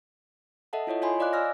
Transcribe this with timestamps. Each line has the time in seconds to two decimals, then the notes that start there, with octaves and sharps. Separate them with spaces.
0.73 A4 D#5 E5 F#5 A5
0.87 E4 F4 C#5 D#5
1.02 F4 C#5 D#5 G#5 B5 C6
1.20 D5 D#5 F5 D6 F#6
1.33 D5 G#5 E6 F6 A#6